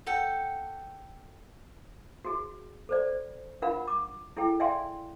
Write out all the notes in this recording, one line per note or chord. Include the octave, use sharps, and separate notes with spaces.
A4 F#5 G5 A5
F#4 G#4
A4 C5 D5
D4 F4 A#4 F5 F#5 B5
D6
E4 G#4 A4 G5
D5 E5 F5 G5 G#5 C6